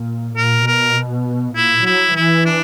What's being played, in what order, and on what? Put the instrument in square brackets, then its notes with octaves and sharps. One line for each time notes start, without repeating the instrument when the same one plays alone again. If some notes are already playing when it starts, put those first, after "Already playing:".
Already playing: [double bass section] A#2
[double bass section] A#2 [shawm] A#4
[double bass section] B2 [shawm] A#4
[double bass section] A#2 [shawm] E4
[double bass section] F#3 [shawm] E4
[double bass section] E3 [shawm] E4
[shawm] D4